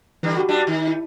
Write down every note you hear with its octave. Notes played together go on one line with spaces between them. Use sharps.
D3 E3 G3
F#4 G4
G2 G3 D4
D#3
E4